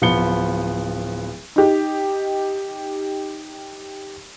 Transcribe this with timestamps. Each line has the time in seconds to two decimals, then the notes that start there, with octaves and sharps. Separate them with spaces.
0.02 D1 F3 B3 C#7 G7
1.56 D#4 G4